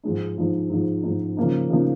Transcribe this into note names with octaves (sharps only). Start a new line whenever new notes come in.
G#2 F3 G#3 D#4
G#2 F3 G#3 D#4
G#2 F3 G#3 D#4
G#2 F3 G#3 D#4
C#3 F3 A#3 D#4
C#3 F3 A#3 D#4